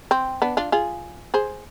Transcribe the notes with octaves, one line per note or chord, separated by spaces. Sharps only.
C4
B3 D4
D4 F4
F4 G#4
G#4 C5